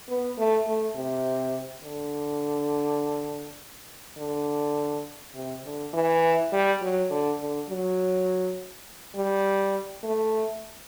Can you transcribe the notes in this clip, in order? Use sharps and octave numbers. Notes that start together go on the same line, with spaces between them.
B3
A3
A3
C3
D3
D3
C3
D3
E3
G3
F#3
D3
D3
F#3
G3
A3